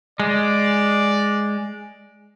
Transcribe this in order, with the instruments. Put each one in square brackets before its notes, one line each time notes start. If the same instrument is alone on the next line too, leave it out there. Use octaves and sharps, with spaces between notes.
[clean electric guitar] G#3 [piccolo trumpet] D5